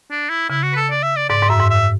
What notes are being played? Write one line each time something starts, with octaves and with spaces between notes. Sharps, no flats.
D4
E4
C#3 E4
F#4
B4
A4
D5
E5
D5
G#2 D5
G#2
F#2 E5
G#2
E5